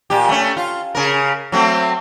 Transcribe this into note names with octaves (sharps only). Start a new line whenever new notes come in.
A#2 G4
A3 C#4
F4
C#3 A#4
F#3 A3 C4